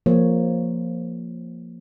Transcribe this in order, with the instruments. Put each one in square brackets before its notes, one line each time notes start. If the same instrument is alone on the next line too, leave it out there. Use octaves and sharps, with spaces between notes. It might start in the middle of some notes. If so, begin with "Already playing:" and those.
[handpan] F3 A#3 C#5